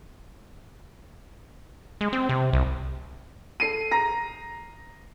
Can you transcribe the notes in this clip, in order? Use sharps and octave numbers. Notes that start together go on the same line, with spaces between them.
G#3
C4
C3
C2
A4 C7 D#7
A#5 A#6